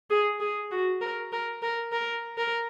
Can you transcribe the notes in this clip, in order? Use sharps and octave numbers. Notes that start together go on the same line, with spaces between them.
G#4
G#4
F#4
A#4
A#4
A#4
A#4
A#4